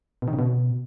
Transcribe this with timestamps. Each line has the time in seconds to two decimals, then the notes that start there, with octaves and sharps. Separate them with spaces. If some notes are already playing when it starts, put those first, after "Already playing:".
0.22 B2
0.28 D#3
0.33 C#3
0.39 B2